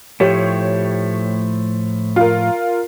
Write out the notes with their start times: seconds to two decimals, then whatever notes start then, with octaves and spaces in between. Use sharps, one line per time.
0.20 A2 F3 A3 G4 C#5
2.16 F4 A#4